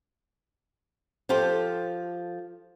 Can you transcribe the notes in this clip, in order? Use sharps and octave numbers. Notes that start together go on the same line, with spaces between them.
F3 F4 G4 A4 C5